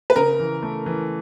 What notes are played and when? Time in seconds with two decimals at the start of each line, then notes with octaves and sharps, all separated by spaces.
0.10 B4
0.16 C#3 A#4
0.40 E3
0.63 A3
0.86 E3